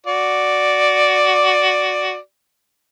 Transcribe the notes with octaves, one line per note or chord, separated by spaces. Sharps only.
F#4 D5